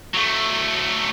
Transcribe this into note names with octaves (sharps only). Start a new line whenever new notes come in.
F#3 A3